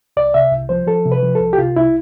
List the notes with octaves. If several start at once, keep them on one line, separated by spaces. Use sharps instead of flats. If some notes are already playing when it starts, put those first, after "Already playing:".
C2 D5
C3 E5
C2
F3 C5
F3 A4
C3
B4
F3
A4
C2
G4
C3 F4
C2 E4